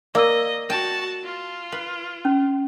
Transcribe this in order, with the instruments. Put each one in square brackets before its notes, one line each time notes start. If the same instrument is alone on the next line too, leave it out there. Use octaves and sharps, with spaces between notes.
[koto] A#3 [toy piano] D5 E6 [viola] D#5
[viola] F#4 A5 [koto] G5
[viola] F4
[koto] B4
[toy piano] C#4